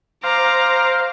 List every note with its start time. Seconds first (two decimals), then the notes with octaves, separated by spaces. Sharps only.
0.24 C5 F5 A#5 D6